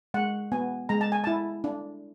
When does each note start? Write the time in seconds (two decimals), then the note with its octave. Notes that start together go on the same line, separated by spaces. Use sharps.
0.14 G#3 F#5
0.52 B3 G#5
0.89 G#3 A#5
1.01 A5
1.12 G#5
1.24 E4 A5
1.64 D4